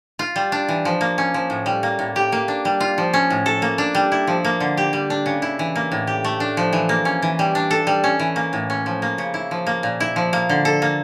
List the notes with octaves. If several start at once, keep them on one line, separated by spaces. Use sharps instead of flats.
F4
G3
D4
E3
F3
A#3
C#4
F3
A2
G3
A#3
A2
G4
A#3
D4
G3
F4
F3
C#4
A2
A4
A#3
D4
G3
E4
F3
A#3
D3
G4
G3
D4
C#3
E4
E3
A#3
A2
G4
A3
D4
F3
E3
A#3
C#4
E3
G3
D4
A4
G3
C#4
E3
A#3
A2
C#4
F3
A#3
C#3
E4
F3
A#3
A#2
E4
F3
A#3
D3
A4
A#3